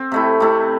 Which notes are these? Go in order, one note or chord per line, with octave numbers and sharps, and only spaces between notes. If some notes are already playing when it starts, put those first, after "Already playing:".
Already playing: C4
C3 A3 E4
C3 A3 E4